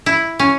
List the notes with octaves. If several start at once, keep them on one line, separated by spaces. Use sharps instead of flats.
E4
C#4